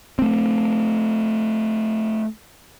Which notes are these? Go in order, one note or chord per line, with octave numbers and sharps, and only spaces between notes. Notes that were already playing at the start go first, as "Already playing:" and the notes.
A3 C4